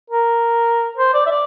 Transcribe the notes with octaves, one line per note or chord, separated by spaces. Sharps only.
A#4
C5
D5
E5
D5